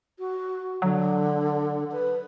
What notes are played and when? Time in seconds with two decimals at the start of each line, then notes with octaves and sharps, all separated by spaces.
0.19 F#4
0.82 D3 F#3
1.92 B4